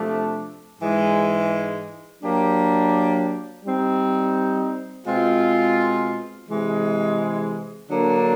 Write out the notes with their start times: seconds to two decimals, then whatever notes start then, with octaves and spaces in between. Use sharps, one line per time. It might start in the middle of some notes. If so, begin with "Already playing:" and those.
Already playing: C3 F3 A3 D4
0.79 G#2 E3 G#3
2.22 F#3 A#3 D4 G4 A#4
3.64 G3 C4 D#4
5.06 B2 G#3 C4 F4
6.48 C3 E3 G#3
7.90 D3 F#3 A#3 D4